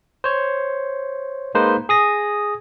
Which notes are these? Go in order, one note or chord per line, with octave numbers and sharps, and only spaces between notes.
C5 C#5
G#3 A#3 D#4 B4 C5
G#4 D#6 A#6